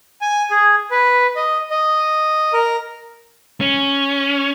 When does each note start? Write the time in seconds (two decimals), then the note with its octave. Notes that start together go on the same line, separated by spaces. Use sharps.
0.21 G#5
0.51 G#4
0.91 B4
1.36 D#5
1.71 D#5
2.53 A#4
3.60 C#4